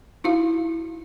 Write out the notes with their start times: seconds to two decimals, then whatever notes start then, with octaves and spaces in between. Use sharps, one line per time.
0.24 D#4 E4 F#4 F5